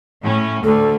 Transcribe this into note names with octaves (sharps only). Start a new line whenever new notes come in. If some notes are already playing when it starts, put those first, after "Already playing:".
A2 C#4
D2 D3 A4